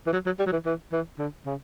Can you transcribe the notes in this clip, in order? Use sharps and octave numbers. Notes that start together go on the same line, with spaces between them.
E3
F#3
F#3
G3
F#3
E3
E3
E3
D3
C#3